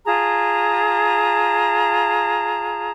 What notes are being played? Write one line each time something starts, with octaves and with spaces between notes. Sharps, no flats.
F4 G#4 A5 A#5